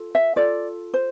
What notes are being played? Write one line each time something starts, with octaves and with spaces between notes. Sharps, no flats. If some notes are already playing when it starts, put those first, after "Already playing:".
Already playing: F4 A4
E5
F4 A4 D5
C5